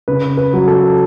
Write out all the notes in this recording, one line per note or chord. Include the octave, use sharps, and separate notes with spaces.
C#3 B4
B4
F#3
A4